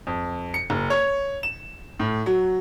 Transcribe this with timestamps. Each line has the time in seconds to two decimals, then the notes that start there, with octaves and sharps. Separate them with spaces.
0.07 F2
0.54 C#7
0.70 F#1
0.90 C#5
1.43 E7
2.00 A2
2.26 F#3